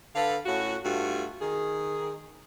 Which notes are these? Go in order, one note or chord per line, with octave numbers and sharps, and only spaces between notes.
D3 A4 B4 F5
A2 C#4 F#4
G2 A3 F4 F#4
D#3 G#4